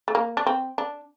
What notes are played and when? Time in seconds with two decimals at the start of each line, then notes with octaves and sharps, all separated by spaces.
0.08 A3
0.15 A#3
0.37 D4
0.46 C4
0.78 D4